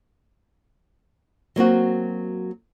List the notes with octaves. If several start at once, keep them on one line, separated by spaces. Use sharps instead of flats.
F#3 A#3 C4 F#4